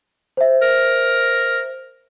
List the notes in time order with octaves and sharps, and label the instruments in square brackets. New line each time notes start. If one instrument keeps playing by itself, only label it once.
[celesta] C5 E5
[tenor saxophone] A#4